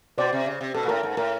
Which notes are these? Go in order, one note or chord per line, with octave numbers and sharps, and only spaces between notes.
B2 C5 D5
C3
C#3
C3
B2 A4
A#2
A2 A#4
G#2
A2 A#4